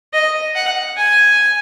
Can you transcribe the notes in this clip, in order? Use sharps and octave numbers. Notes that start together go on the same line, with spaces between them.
D#5
F#5
G#5